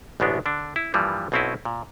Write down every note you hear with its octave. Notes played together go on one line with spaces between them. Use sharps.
A1 D2 B2 G#3 B3 D4
D3 D4
E4
G2 E3 F3 G3 A#3
B1 B2 C4 C#4 E4 D#5
A#2